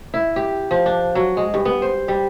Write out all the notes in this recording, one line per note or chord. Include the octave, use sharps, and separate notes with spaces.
E4
G4
F3
D4
F#3
G#3
G2
B3
C5
G3